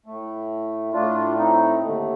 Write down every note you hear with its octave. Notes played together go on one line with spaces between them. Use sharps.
A2 A3
A2 A3 D4 F4
C4 D#4
D#2 D3 A3